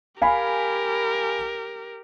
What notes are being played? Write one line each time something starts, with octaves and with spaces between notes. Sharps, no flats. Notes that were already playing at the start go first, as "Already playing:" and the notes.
G4 A#4 F5 G#5 B5